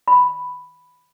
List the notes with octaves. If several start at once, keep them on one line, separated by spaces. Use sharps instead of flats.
B5